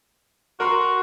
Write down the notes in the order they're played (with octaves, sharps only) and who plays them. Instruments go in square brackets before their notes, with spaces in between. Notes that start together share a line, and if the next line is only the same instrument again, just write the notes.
[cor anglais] F#4 [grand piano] A#4 C6